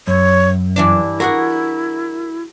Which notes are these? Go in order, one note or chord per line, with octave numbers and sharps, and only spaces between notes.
F#2 C#5
G2 E3 D4 E4
F#4 G#4 A#4 F#5